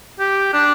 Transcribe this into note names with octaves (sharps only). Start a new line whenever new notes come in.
G4
D4